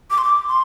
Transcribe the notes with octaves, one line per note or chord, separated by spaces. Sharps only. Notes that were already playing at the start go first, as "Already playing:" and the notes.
D6
C6
D6
C6